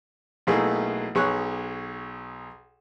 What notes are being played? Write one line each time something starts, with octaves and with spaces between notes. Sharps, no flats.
B1 B2 A3 A#3 E4 G#4
B1 G#4 C#5 C#6 F#6